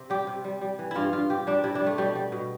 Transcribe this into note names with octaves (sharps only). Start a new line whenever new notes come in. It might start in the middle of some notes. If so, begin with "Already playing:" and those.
Already playing: C3
G3 G4
C3
G3
G3
E3
G2 E4 F4
G2 F4
C3 G4
G3 D4
C3 E4
D4
G3
A3
B2 G3
G3
B2